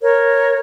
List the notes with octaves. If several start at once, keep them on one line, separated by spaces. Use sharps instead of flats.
A#4 C#5